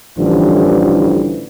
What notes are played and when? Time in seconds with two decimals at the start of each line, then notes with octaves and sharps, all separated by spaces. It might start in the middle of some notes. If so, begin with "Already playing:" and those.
0.19 A1 D3 E3 F3 G3